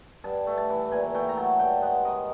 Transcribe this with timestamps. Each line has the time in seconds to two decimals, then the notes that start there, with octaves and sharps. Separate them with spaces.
0.24 G2 A5
0.47 A3
0.58 A5
0.69 E3
0.91 A#2 G#5
1.14 A3 G5
1.29 A#5
1.36 F#3 A5
1.59 G2 G5
1.82 G#3 F#5
2.05 D#3 D#5